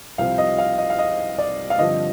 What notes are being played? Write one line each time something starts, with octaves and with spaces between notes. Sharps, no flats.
C2 C3 F3 C4 F5
D#5
F5
D#5
F5
D#5
D5
F5
G2 D3 F3 C4 D#5